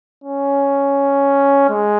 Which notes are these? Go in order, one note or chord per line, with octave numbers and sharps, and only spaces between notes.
C#4
G#3